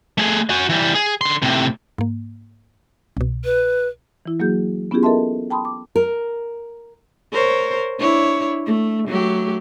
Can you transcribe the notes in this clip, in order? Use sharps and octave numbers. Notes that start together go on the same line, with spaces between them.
A3 G#4
F#4 G#5
E3 G3
G#4
D3 C6
A2 C3
G#2 A#3
C2 B2
B4
E3 E4
F#3 A#3 F#4 G#4 G6
B3 C#4 E4 F4 G4 G#4
A4 A#4 D#5 E5 A5 C6
G5 A5 B5 C6 D#6
D6
A#4
A#4 C5 C#5
D4 E4 C#5
A3
F#3 A3 G4